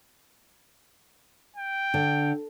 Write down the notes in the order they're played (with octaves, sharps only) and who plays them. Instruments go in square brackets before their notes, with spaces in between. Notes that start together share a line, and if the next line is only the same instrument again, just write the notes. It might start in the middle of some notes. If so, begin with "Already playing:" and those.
[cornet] G5
[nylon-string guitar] D3